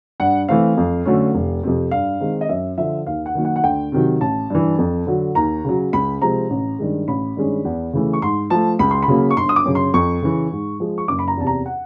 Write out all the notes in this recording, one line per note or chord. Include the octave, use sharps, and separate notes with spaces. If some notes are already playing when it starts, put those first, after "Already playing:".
G2 F#5
E3 A3 C4 F5
F2
D3 F#3 A3 C#4
F1
F2 C3
G2 F5
D#3 G#3 C4 D#4
D#5
F#2 E5
D3 F3 E5
D#2 F5
F#5
D#3 F#3 A#3
F#5
F#5
D2 G5
C3 D#3 F#3
A1 A5
G2 E3
F2
D3 F#3
D#2 A#5
C#3 F#3
C#2 B5
C3 F3 G#3 C4 A#5
A1
G2 D#3 G#3
A1 B5
G2 D#3 G#3 C#4
E2
C#3 E3 A3
C#6
G#2 C6
F3 A3 A5
C#2 B5
C6
B5
C#3 F#3 A#3
C#6
G1 C6
D#6
D6
F#2 C#3
C6
F2 C#6
C#3 E3
G#2
F3 G#3
C#6
F#1 D6
B5
A#5
E2 C3 A5
A#5
F#5